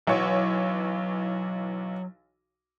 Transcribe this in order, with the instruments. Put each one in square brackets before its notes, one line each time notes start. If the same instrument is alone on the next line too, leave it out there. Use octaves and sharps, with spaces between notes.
[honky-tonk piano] B1 E3 C#5 [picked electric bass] F#3